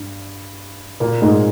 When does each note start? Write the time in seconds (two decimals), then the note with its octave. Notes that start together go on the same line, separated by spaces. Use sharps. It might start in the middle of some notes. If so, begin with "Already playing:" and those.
Already playing: G2
1.00 A#2 A#3
1.21 G#2 G#3